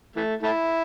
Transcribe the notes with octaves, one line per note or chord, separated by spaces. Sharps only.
E3 A3
A3 E4